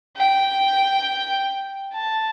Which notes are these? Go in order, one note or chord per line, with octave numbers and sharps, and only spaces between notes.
G5
A5